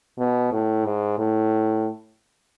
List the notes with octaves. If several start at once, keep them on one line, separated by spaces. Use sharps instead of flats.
B2
A2
G#2
A2